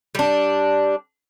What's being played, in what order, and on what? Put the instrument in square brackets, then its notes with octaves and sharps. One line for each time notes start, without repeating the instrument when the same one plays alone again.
[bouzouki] G3 D4